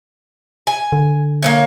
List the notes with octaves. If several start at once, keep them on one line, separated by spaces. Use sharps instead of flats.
G#5
D3
A#3 B3 C#5